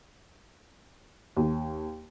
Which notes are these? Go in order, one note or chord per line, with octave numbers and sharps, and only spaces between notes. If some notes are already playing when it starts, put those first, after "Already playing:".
D#2